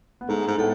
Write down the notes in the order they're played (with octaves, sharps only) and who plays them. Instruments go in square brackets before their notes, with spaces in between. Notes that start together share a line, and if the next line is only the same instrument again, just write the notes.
[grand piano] B3
[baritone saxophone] G#2 [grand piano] A3
[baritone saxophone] G#2
[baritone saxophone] A2 [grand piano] B3